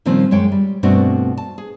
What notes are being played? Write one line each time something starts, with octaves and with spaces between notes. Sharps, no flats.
A#2 D#3 F3 G3 C4 C#4
F#2 G#3 C#5 G5
G3
G2 B2 A3 C4 D4 F#4
A5
G#4